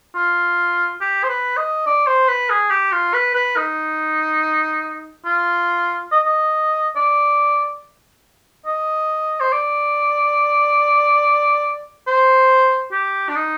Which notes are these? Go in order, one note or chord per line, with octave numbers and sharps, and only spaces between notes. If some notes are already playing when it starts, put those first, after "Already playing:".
F4
G4
C5
B4
D#5
D5
C5
B4
G#4
G4
F4
B4
B4
D#4
F4
D#5
D#5
D5
D#5
C5
D5
C5
G4
D4
D#4